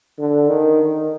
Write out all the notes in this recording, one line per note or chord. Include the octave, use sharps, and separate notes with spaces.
D3
D#3